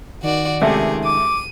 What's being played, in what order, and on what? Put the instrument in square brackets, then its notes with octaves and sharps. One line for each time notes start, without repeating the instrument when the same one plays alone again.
[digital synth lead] D#3 [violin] F#4 D5
[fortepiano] C#2 C3 A3 [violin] G4 G#4
[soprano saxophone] D6 [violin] D#7